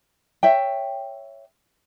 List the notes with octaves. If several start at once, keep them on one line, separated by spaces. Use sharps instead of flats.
C#5 E5 G5